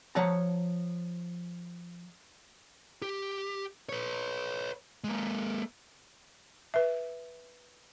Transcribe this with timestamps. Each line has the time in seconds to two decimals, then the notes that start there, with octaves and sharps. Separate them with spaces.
0.15 F3 C#5 F#5 A5 A#5
3.02 G4
3.89 B4 C#5
5.04 G#3 A#3
6.74 B4 E5